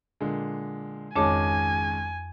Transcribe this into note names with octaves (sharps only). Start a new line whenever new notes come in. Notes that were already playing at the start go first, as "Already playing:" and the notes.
A#2 D3 G#3
G#1 F2 G#3 C#4 C#5 G#5 A5 D6